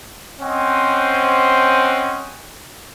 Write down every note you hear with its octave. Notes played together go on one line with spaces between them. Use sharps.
C4 C#4 C5 D#5 F#5